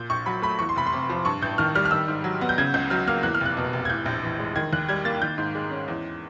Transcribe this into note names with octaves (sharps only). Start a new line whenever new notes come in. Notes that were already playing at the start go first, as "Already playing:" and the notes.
Already playing: A#2 G6
A#1 C#6
F#3 B5
A3 B5
E2 C#6
C6
F1 B5
C6
C3
F3
G2 C#6
A1 G6
D#3 F6
G3 F6
F6
D#3 E6
G#2
F#3
B3
G6
C#3 G#6
C#2 G6
F#3 F6
A#3 F6
E2 F#6
F6
F1 F#6
B2
F1
G#6
A2 G6
A#1
E3
G#3
D#3 G#6
D#2 F#6
G3 G#6
A#3 A6
D#3 G6
G#2
G#3
C#4
E2